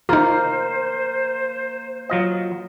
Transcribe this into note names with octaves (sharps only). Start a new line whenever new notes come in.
A#3 D#4 F4 C5
F#3 F4 D#5